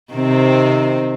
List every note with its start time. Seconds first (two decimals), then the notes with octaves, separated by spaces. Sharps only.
0.13 C3 D#3 C4